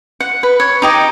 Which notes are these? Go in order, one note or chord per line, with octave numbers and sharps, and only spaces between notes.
F#5
B4
C#5
D#4 G4 D#5